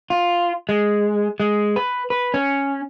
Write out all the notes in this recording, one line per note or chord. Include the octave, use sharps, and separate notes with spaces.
F4
G#3
G#3
B4
B4
C#4